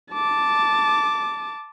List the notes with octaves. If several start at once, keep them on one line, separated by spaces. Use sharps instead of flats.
A5 D6